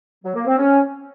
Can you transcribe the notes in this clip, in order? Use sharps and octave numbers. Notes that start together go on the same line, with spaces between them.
F#3
A#3
C4
C#4